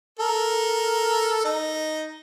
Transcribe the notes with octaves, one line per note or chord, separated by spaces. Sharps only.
A4 A#4
D#4